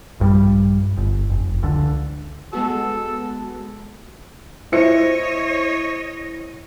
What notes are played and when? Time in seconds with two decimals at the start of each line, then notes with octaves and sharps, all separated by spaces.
0.20 A#1 G2 D#3 G3
0.97 G1
1.30 F1
1.63 C#2 D3
2.53 G#3 B3 F#4 A4
4.72 E4 C5 C#5 D#5 C#7